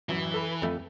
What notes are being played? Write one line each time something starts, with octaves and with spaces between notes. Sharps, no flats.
A1 F#2 E3 F#3
A4 B4
F2 A3